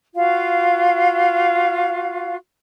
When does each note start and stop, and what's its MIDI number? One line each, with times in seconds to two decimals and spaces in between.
0.15 2.36 65
0.15 2.36 66
0.15 2.36 77